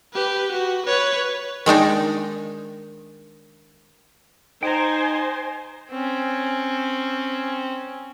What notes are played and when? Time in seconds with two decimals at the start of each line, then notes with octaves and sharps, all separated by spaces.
0.13 G4 B4
0.52 F#4
0.86 B4 C#5
1.66 D#3 G#3 D4 D#4
4.63 D#4 C5 G5 G#5 A#5
5.91 C4 C#4